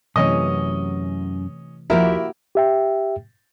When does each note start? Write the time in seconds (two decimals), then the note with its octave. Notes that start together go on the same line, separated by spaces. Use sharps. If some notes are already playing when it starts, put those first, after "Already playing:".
0.16 F#2 C3 E3 A3 C#4 D#5
1.90 D#2 F3 A#3 E4 F#4 G4 A#4 E5
2.55 G4 E5 G5